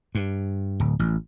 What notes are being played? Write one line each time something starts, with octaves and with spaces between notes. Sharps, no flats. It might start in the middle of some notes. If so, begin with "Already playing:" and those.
G2
D1
A1